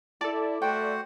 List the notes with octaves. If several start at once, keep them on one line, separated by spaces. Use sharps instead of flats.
E4 A4 D5 A5
A3 F#4 C5 F#5 G5